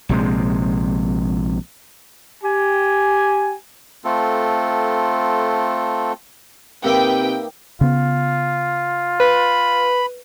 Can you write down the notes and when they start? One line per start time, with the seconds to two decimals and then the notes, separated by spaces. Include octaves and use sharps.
0.09 A#1 C3 G#3
2.43 G4 G#5
4.05 A3 C4 F4 A4
6.84 C3 A#3 D#4 B4 E5 G5 D6
7.81 C#3 B3 F4
9.20 B4 B5